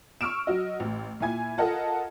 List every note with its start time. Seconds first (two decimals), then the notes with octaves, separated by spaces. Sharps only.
0.21 C#6 E6 F6 D7 E7
0.47 F#3 F#4 D#5
0.80 A1
1.20 A#2 E4 G#5 G#6
1.58 F4 A4 A#4 D#5 F#5 A5